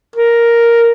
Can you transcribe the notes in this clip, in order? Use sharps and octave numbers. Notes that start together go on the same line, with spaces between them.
A#4